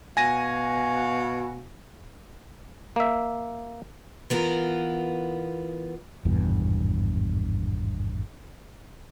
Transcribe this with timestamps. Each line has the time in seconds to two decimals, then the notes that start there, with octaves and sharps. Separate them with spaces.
0.17 B2 F#4 F5 G#5 A#6 D#7
2.96 A#3 E5
4.30 E3 B3 F4 A#4
6.25 G#1 E2 G2 B2